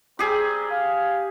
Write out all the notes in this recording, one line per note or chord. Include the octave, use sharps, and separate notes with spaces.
G3 C4 G4 G#4 A#4
F5